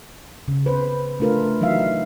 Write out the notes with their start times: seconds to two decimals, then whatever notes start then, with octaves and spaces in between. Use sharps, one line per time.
0.48 C#3
0.66 B4 C5
1.20 A3 D4 F4 A#4 B4
1.61 E3 F#3 D#4 E5 F5